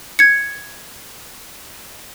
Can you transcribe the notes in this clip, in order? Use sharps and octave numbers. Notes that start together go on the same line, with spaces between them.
G#6 C#7